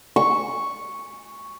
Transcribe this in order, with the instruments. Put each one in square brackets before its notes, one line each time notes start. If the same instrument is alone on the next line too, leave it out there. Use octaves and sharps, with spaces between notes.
[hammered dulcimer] C#6